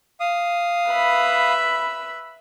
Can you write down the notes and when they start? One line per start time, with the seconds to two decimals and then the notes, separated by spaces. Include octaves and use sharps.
0.20 F5 D#6
0.89 B4 E5 B5